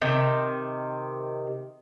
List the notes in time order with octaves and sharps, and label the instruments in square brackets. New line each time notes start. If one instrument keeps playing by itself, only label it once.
[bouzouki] C3 D#3